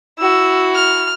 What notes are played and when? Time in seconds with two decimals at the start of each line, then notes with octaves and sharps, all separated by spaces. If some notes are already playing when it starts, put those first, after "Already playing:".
0.19 E4 F#4 E6
0.75 F6